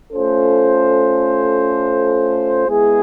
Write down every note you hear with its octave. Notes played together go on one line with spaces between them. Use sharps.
A3 C#4 F4 A4 C5
G#3 B3 E4 G#4